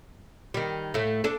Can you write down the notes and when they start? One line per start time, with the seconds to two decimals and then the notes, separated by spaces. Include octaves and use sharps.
0.54 D#3 G3
0.94 A2 A3
1.24 D4 A4